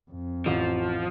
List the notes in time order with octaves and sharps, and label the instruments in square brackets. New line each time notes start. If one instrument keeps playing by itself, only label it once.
[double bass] F2
[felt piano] A1 [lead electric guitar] F3